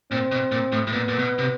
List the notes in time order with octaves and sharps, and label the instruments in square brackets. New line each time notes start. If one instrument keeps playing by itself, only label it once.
[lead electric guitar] A#2 [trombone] C4
[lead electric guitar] B2
A#2
A2
A2
[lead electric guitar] A#2 [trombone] B3
[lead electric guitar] A#2
B2
C3